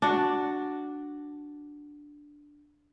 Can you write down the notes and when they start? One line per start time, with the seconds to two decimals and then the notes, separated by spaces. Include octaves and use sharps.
0.02 D4 F#4